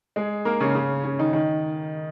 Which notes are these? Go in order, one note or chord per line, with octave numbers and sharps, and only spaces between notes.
G#3 G#4
A#3 A#4
C#3 C#4
C#3 C#4
C#3 C#4
D#3 D#4
D#3 D#4